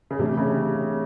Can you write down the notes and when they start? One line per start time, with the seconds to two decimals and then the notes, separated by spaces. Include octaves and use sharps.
0.11 C#3
0.19 A2 C3 E3 A3 D4
0.37 C#3